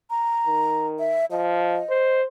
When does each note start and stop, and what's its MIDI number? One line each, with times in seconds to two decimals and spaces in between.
0.10 0.86 82
0.47 1.22 51
0.99 1.25 76
1.31 1.80 53
1.31 2.20 75
1.90 2.24 72